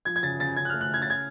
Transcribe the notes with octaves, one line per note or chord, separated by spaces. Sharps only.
F3 G#6
G#6
C#3 A6
C#3 A6
C#3 G#6
F#6
A3 F6
F#6
C#3 G#6
A6
C#3 G#6